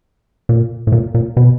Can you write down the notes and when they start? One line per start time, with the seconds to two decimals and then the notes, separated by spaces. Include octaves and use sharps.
0.49 A#2
0.87 A2
0.92 A#2
1.14 A#2
1.37 B2